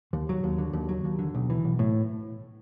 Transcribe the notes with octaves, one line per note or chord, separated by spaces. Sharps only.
D#2
F#3
D#2
D3
D#2
F#3
D#2
D3
B1
E3
B1
A2